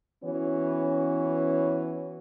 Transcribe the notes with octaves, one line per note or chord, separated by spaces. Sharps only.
E3 B3 C#4 F#4 C#5